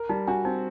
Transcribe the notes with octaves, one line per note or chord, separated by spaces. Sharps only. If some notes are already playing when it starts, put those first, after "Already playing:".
Already playing: A#4
G3 D#4
D4 F#4
C4 D#4